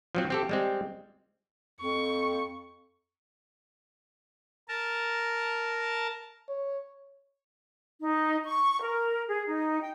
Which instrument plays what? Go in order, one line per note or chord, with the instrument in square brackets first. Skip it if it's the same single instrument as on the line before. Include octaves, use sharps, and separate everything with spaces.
[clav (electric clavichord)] F3 F#3 C4
C4 G4 A4
G3 G#3 C4
[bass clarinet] F2 [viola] C#6
[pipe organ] A#4 A5
[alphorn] C#5
[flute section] D#4
C#6
A#4
G#4
D#4
G5